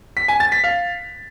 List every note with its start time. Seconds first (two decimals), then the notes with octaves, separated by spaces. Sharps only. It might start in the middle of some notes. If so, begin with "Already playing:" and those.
0.17 B6
0.28 G#5
0.40 A6
0.52 B6
0.64 F5